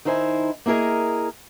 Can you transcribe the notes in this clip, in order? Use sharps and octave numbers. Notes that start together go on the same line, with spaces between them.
D#3 D#4 E4 C5 G#5
A#3 E4 G#4 A#4 D#5